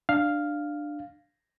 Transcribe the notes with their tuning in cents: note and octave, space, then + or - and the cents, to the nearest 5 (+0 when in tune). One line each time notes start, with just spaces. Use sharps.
D4 +15 F5 +0